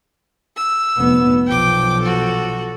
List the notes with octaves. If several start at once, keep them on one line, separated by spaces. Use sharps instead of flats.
E6
F1 B3
B1 F3 G5 D6
F#4 A4